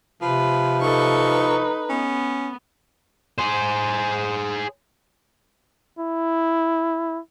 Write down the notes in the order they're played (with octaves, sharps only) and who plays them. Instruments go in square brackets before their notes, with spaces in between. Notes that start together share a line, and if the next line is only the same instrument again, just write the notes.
[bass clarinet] C3 [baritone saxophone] F3 [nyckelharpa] B4
[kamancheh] D#4 B4 [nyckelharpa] A4 C#6
[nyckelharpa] B3 [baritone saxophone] C#4
[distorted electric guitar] G#4 C5
[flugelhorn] E4